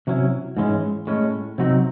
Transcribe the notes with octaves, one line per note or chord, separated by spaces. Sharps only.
C3 F#3 C#4 E4
G#2 E3 G#3 C#4
A2 G#3 C#4
C3 F#3 C4 D#4